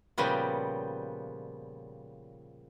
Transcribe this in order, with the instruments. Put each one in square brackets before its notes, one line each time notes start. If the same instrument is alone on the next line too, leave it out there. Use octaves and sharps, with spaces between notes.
[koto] A#2 C#3 F3 G3 B3